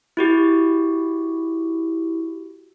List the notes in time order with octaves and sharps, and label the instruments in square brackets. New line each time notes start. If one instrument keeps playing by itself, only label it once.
[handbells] E4 F#4 G4